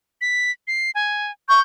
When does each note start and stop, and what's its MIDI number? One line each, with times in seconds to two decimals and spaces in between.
0.21 0.51 95
0.67 0.91 96
0.95 1.32 80
1.48 1.59 85
1.48 1.62 91